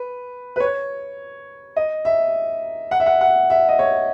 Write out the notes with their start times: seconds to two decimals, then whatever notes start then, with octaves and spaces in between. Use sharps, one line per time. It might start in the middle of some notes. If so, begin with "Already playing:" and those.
Already playing: B4
0.56 B4
0.60 C#5
1.76 D#5
2.05 E5
2.91 F#5
3.00 E5
3.06 F#5
3.21 F#5
3.50 E5
3.69 D#5
3.79 C#5